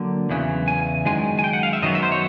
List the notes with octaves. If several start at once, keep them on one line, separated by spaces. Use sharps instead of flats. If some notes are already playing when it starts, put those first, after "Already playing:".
Already playing: D3 F#3 A#3
E2 C#3 E3
G#5
F#2 D#3 G#3 G#5
G#5
G5
F#5
F5
E5
F#2 D#3 F#3 B3 D#5
E5
C5
C#5